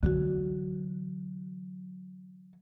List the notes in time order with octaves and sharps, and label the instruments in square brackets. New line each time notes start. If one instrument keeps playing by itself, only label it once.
[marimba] D3 F#4 [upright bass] E3 F#3